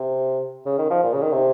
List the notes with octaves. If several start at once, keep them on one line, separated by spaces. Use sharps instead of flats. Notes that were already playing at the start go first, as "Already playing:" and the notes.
Already playing: C3
C#3
D#3
F3
A#2
C#3
D#3
C3